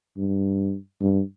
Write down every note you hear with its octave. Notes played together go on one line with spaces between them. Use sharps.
G2
G2